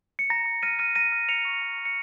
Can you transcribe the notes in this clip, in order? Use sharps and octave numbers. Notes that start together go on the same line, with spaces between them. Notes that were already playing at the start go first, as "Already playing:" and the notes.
C#7
A#5 A#6
A#5
F6 A#6 D#7
F6 A#6 D#7
A#5 A#6 D#7
F6
A#5 C#7 F7
C#6
A#5
A#5
C#7